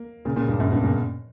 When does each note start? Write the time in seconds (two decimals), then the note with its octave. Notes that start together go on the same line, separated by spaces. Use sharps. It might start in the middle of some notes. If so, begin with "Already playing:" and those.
Already playing: A#3
0.25 A#2 C#3
0.36 A#2 C#3
0.48 G2
0.60 F#2 A#2
0.72 G2 B2
0.83 A#2 C#3